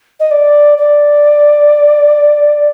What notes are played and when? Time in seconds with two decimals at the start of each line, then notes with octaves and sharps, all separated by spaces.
0.20 D#5
0.31 D5
0.78 D5